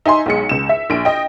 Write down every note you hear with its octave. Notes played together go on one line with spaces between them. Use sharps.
D#4 E5 G#5 C6
B1 G#3 C#7
C#2 E7
E5
A#1 D7
D#5 G5